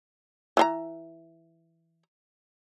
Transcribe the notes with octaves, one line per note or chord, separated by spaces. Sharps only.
E3 F4 A#5